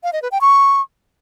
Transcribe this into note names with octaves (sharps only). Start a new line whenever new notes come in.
F5
D#5
B4
G5
C#6